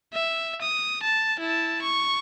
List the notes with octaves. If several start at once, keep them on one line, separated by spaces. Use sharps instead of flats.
E5
D#6
A5
E4 A5
C#6